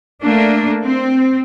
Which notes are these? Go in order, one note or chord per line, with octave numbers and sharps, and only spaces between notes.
A3 A#3 D4
C4